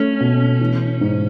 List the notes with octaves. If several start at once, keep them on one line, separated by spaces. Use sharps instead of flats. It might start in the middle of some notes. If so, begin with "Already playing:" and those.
Already playing: A3 C#4
B2
E3
G#2